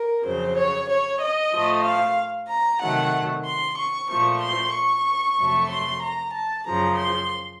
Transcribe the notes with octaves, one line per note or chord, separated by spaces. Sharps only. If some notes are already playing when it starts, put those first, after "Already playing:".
Already playing: A#4
F2 C#3 F#3 C5
C#5
C#5
D#5
A2 F3 A3
F5
A#5
C3 D#3 F#3 A3 F#5
C6
C#6
A#2 F3 A3 C#6
C6
C#6
F2 C3 F#3 A3
C6
A#5
A5
F#2 C#3 F3 A#5
C6